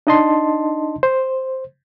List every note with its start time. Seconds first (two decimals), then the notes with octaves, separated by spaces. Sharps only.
0.07 D4 D#4 D#5 A5 C6
1.03 C5